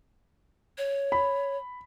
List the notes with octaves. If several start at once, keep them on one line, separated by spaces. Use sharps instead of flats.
C#5
B5